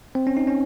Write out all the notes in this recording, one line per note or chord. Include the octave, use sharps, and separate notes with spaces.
C4
C#4
D#4
C#4